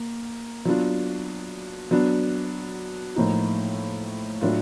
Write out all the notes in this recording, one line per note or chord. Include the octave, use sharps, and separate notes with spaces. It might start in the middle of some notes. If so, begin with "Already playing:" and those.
Already playing: A#3
F#3 B3 D4 F4
F#3 B3 D4
A2 F3 A#3 D#4
A2 F#3 A3 D4 F4